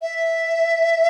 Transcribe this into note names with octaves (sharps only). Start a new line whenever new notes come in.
E5